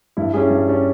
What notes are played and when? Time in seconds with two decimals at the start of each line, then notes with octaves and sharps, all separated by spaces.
0.17 G2 E4
0.34 G3 C#4 E4 G#4
0.50 G2
0.67 G3 C#4